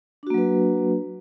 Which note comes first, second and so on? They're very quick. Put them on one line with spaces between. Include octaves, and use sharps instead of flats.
D4 F#4 A#3 F#3 B4